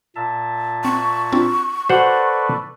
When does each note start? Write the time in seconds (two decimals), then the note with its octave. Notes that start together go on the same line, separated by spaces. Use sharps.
0.16 A#2 E5 A5
0.85 C4 C#6
1.33 C4 D4 F4
1.89 F#4 A4 B4 C5 D5 F#5